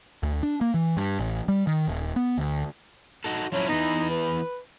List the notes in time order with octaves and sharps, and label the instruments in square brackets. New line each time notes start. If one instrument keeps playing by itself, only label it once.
[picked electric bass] D2
D4
A#3
E3
G2
A1
G3
D#3
D#1
B3
D2
[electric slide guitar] D#4 F#4 A4
[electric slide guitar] F3 C#4 E4 [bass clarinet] F#3
[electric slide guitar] E3 B3 [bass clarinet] D#4
[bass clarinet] B4